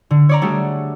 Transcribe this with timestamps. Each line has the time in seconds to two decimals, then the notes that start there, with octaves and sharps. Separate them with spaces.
0.11 D3
0.29 C#5 D5 A#5
0.42 G3 A3 D4 F#4 G#4